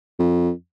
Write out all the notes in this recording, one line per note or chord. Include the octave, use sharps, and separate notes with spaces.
F2